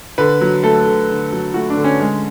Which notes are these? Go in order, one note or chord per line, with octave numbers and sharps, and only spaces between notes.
D3 B4
F#3
A3 A4
D3
D3
F#3
A3 F#4
D4
D3
C#4
G#3 C#4